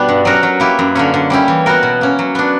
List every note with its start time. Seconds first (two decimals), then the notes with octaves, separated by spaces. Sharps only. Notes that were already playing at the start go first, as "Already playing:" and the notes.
Already playing: B2 G3 B3 D4
0.09 G2
0.25 F#3 C#4 F#4 A#4
0.43 F#3
0.60 A#3 E4 G4 B4
0.79 F#2
0.95 D3 A#3 C#4
1.14 D3
1.30 G3 C#4 E4 G4
1.48 E3
1.66 B3 F#4 A#4
1.83 B2
2.01 A#3 C#4
2.19 F#3
2.35 B3 D4